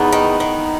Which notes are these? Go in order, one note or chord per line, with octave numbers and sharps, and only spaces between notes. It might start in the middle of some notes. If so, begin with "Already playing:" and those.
Already playing: E2 B3 D#4
D#3
D#3